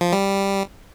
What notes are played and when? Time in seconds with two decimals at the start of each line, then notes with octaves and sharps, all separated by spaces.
0.01 F3
0.12 G3